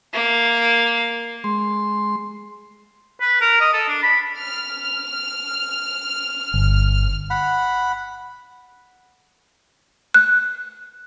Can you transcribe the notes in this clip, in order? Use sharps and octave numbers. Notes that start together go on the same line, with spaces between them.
A#3
G#3 C6
B4
A#4
D#5
A4
D4
B5
F6
G1
F#5 B5
F#6